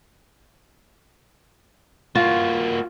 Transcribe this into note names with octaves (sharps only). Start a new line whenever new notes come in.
A#3 F4 F#4